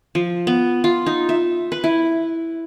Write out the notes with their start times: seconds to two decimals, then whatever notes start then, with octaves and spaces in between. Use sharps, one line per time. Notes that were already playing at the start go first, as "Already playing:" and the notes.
0.15 F3
0.47 B3
0.84 F4
1.06 D#4
1.29 E5
1.72 B4
1.84 E4